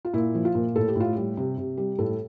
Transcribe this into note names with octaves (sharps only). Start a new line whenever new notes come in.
F4
A#2 E4
F3
F4
A#2
A2 A4
G4
A2 F4
G3 G4
C3
C3
G3
A2 A4